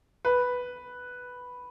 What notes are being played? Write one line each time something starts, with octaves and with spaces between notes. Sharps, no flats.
B4